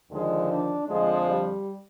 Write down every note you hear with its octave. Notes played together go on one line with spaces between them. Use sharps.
D#2 D3 F3 G#3
D4
F2 D3 F3 G#3
G3